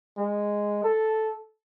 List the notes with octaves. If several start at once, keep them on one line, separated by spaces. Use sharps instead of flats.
G#3
A4